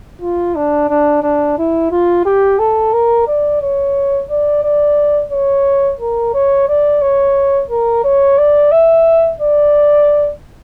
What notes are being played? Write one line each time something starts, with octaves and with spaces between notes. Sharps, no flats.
F4
D4
D4
D4
E4
F4
G4
A4
A#4
D5
C#5
D5
D5
C#5
A#4
C#5
D5
C#5
A#4
C#5
D5
E5
D5